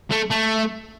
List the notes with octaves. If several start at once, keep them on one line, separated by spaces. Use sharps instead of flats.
A3
A3